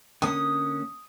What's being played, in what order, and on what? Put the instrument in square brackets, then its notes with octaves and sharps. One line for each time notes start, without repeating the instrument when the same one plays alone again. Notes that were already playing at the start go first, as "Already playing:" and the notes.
[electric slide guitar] D3 A#3 C#4 [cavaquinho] D#6